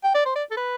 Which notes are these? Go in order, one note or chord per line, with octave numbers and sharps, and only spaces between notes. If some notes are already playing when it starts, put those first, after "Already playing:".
G5
D5
C5
D5
A4
B4